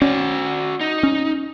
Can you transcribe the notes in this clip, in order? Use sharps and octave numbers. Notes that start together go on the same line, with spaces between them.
C#4 F#4 D5
D#4
C#4